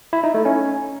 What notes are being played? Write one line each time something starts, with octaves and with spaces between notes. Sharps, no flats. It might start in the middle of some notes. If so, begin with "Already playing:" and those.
E4
D#4
A3
C#4